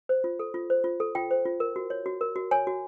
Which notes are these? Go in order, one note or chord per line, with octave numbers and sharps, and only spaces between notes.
C5
F4
A4
F4
C5
F4
A4
F4 G5
C5
F4
A#4
F#4
C#5
F#4
A#4
F#4
C#5 G#5
F#4